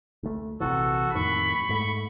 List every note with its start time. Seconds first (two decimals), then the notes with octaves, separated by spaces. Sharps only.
0.23 D2 A3
0.60 A#1 C3 E3 F#4 A4
1.15 F2 A2 D#3 B5 C#6
1.69 G#2 A3